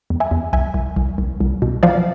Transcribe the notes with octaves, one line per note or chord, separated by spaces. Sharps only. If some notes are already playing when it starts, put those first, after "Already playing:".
E2
E5 G#5
E2
C2 E5 G#5
C2
C2
C2
C2
B2
F3 D5 F5